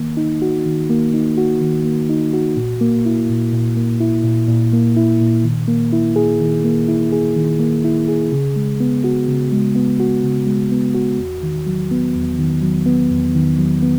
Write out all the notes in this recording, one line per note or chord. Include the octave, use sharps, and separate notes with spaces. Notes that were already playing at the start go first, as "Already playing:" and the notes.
Already playing: D#3 A#3
D#4
F#4
D#3
A#3
D#4
F#4
D#3
A#3
D#4
F#4
A#2
A#3
E4
A#2
A#2
A#3
E4
A#2
A#2
A#3
E4
A#2
D#3
A#3
E4
G#4
D#3
A#3
E4
G#4
D#3
A#3
E4
G#4
C#3
G#3
B3
F#4
C#3
G#3
B3
F#4
C#3
G#3
B3
F#4
E2
D#3
F#3
B3
E2
D#3
F#3
B3
E2
D#3
F#3
B3